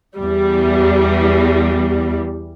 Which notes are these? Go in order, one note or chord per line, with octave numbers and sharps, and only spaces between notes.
E2 G3